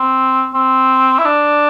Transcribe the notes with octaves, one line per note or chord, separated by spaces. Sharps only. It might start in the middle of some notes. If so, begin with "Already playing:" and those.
Already playing: C4
C4
E4
D4